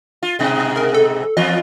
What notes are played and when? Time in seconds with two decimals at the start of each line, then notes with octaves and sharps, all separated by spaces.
0.23 F4
0.39 G#2 B2 G#3
0.76 A#4
0.94 A4
1.37 E2 F3 F4 D#5